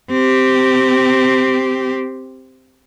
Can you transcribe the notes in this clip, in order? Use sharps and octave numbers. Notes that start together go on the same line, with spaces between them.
C4 G4